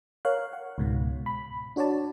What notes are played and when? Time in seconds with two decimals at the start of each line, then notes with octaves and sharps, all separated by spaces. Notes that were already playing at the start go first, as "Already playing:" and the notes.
0.25 A#4 C#5 F5 F#6
0.53 F#5
0.78 C#2 G#2 B2
1.26 B5
1.76 D4 F#4 C#5 D5 A5